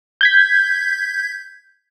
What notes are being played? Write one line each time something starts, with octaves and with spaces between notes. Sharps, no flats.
G6 G#6 B6